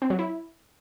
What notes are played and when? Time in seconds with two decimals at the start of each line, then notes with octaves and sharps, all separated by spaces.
0.02 C4
0.10 F#3
0.19 E4